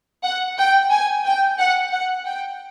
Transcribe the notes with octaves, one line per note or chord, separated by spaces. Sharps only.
F#5
G5
G#5
G5
F#5
F#5
G5